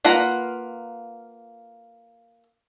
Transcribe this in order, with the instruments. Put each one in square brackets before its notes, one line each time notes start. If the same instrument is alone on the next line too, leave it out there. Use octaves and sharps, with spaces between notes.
[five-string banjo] A#3 F4 B4 F#5 A#5